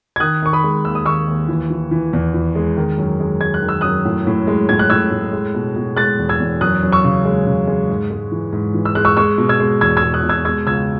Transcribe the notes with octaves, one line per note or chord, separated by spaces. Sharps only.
G#6
D#3 D#6 F#6
D#3 C#6
B5 D#6
G#3
D#2 E6
D#6
D#2 C#6 E6
D#2
E3
E3
E3
E2
E3
G#3
D#3
F#2
G#3
G#3 G#6
F#6
D#3
E6
F#2 D#6 F#6
A2
A2
G#3
A2 G#6
F#6
A2 E6 G#6
A2
G#3
B2
B2
G#3 F#6 A6
E2
E6 G#6
E2
F#2 D#6 F#6
F#2
C#6 E6
C#3
G#3
C#3
G#3
G#2
G#3
E3
G#2
E3
E6
G#3 F#6
C#6 E6
G#3 C#6 E6
B2
E6 G#6
G#3
E2 E6 G#6
E6 G#6
G#3
D#6 F#6
B2
E6 G#6
G#3 E6 G#6
C#2 E6 G#6